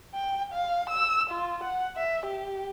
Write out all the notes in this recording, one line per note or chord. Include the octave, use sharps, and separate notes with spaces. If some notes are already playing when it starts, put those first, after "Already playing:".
G5
F5
E6
F4
F#5
E5
G4